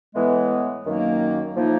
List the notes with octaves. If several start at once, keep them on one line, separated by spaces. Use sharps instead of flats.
A2 E3 G#3 B3
F#2 D#3 F#3 A#3
A2 F3 A#3 D#4